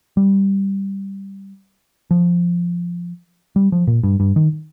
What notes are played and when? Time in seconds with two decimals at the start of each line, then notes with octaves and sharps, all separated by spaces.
0.17 G3
2.11 F3
3.56 G3
3.72 F3
3.87 A#2
4.03 G2
4.20 G2
4.36 D#3